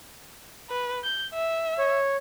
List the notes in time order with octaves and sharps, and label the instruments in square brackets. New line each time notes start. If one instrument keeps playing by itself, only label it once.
[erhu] B4
G6
E5
[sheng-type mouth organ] C#5